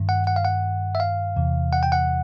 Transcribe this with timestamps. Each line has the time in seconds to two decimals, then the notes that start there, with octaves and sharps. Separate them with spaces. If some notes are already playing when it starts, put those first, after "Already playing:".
Already playing: G2 D#3
0.09 F#5
0.27 F#5
0.36 F5
0.45 F#5
0.95 E5
1.00 F5
1.36 E2 C3 E3
1.73 F#5
1.83 G5
1.92 F#5